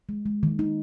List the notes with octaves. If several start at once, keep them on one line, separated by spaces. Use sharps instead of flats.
G#3
G#3
D#3
D#4